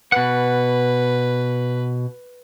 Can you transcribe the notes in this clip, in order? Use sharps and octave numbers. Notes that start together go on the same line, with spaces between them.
B2 B4 F#5